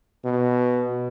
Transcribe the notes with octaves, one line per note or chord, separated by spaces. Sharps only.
B2